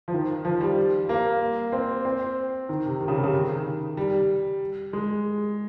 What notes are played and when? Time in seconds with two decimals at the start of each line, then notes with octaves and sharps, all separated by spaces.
0.08 F3
0.14 D#3
0.45 F3
0.61 G3
1.09 A#3
1.72 C4
2.05 C4
2.69 D#3
2.85 C3
3.01 D#3
3.08 C#3
3.15 C3
3.23 C#3
3.33 D#3
3.97 G3
4.93 G#3